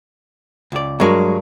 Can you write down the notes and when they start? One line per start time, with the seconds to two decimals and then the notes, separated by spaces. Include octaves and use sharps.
0.72 C#2 D5
1.00 G2 F#3 G#3 A#4 C#6